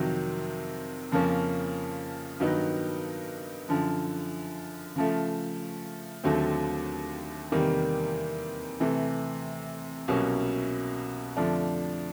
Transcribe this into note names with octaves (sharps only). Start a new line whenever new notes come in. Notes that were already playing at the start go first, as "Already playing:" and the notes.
Already playing: F2 C3 D#3 F#3
F2 C#3 F3 A#3 C#4
G2 D#3 F#3 B3 D#4
F#2 D3 F3
C#3 F3 A3
D#2 D3 F#3 A3 C4
E2 C3 D#3 G3 A#3
C3 E3 A3
C2 B2 F#3 A#3 C#4
F2 D3 F3 A3 D4